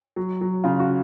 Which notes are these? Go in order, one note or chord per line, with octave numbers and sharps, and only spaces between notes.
F#3
F#3
C#3 F4
F#4